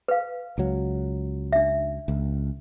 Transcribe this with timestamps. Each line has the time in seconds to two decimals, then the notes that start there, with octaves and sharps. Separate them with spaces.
0.08 B4 F5
0.58 C#2 F#3
1.52 D4 E5
2.08 C#2